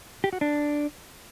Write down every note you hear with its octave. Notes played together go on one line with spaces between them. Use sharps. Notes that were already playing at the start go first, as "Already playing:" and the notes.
G4
F#4
D4